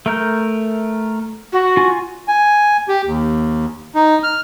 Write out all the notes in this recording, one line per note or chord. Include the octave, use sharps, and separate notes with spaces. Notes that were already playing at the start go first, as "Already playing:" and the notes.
A3 A#4 G6
F#4
F4 G#5
G#5
G4
D#2
D#4
F6